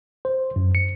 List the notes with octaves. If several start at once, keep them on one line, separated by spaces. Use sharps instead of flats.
C5
F#2
C#7